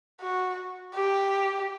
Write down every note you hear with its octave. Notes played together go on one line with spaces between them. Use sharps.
F#4
G4